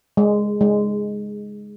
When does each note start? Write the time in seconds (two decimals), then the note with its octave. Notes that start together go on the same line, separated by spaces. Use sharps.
0.17 G#3
0.61 G#3